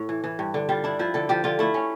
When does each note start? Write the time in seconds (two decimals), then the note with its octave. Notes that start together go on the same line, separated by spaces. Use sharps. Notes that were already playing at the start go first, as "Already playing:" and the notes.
Already playing: A2
0.09 E3
0.24 E3
0.39 G2
0.54 D3
0.69 G3 F4
0.84 D4 E4
0.99 F3 E4
1.14 D3 A4
1.29 F3 G4
1.44 D3 F4
1.59 A3 E4
1.74 C#4